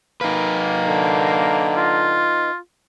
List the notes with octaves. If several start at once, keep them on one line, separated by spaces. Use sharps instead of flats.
A#3 D#4 B4
D3
F4